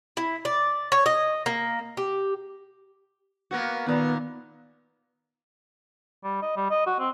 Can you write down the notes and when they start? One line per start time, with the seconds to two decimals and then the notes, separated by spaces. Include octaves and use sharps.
0.17 E4
0.45 D5
0.92 C#5
1.06 D#5
1.46 A#3
1.97 G4
3.51 A#3 B3 F#4
3.86 A#2 D#3 B3
6.24 G3
6.42 D#5
6.56 G3
6.71 D#5
6.87 F#4
6.99 C4